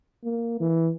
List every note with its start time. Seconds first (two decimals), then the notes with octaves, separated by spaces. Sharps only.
0.24 A#3
0.60 E3